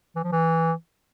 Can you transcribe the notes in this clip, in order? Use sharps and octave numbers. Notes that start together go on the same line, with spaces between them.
E3
F3
E3